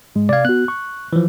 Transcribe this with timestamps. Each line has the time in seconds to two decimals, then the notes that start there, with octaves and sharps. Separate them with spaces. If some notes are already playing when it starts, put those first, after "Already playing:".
0.16 G#2 G#3
0.29 C3 D5 F5 G#6
0.45 B3 F#4 F#6
0.68 C#6
1.13 E3 F3